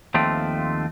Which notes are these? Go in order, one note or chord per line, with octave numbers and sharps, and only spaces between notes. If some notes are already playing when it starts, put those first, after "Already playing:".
D#2 F3 A3 C4